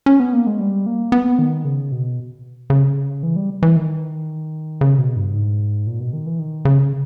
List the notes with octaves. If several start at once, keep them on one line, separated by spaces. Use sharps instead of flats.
C#4
B3
A#3
G#3
G3
A#3
B3
D#3
C#3
B2
C#3
E3
G3
E3
D#3
C#3
B2
G2
G#2
A#2
B2
D#3
E3
D#3
C#3